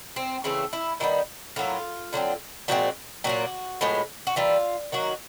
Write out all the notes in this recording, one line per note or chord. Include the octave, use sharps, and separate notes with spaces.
C4
C#3 E3 A3 C4
E4
D#3 G3 B3 E4
A2 F#3 A#3 F4
D3 F#3 A3 C4
A#2 F3 G#3 C4 F#4
A#2 F#3 A#3 F#4
A2 F3 G#3 B3
F#4
E3 G3 A#3 F4
D#3 F#3 A#3 F#4